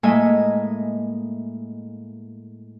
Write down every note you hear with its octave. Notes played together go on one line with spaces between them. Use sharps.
A2 G#3 A#3 D#5 E5 G#5